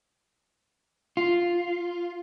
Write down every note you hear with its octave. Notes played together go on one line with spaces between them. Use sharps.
F4